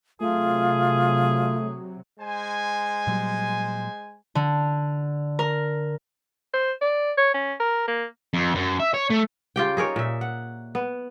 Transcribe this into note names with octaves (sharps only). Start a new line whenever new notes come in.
C3 F#3 A3 F4 G#4
G#3 C5 G#5
A#2 F#3 G3
D3
A#4
C5
D5
C#5
C#4
A#4
A#3
F2
F#2
E5
C#5
A3
C#3 F4 G4 G5
D#4 G#4 A#4 C#5
A#2 E5
F#5
B3